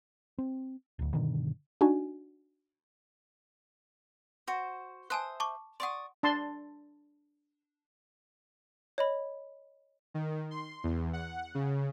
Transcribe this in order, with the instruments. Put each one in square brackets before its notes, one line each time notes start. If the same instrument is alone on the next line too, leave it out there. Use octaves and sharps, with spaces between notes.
[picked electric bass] C4
D1 D2
G2 B2 D3 D#3
[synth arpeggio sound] D4 D#4 F#4 G#5
[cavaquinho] F#4 C5
[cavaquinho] C5 E5 D#6 [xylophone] G#5 A5 F#6
[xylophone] A5 C#6 D6
[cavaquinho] D5 C#6 D#6 [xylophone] F#5 C6
[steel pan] D4 A5 C6
[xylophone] C#5 D#5 B5
[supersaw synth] D#3
C6
E2
F#5
C#3